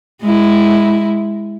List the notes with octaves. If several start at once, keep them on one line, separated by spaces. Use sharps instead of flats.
G#3 E4